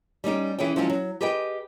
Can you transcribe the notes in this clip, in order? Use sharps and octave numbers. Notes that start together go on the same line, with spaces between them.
G3 C#4 D#4 G4
E3 C#4 G#4 C#5 G5
F3 F#3 G#3 C4 C#4
F#3
G4 G#4 B4 D#5 G5